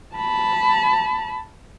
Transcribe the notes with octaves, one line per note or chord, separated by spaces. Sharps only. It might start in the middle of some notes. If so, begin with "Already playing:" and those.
A5 B5